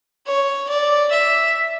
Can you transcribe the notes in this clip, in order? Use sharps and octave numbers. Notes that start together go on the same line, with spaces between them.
C#5
D5
E5